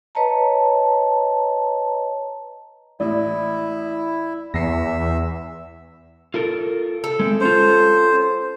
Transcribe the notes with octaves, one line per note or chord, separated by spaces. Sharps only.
B4 C#5 D#5 A5 A#5
A1 A2 E4 D5
E2 E5 A#6 C7 C#7
F4 A4 A#4
A4
G#3 C4
C#4 F4 C5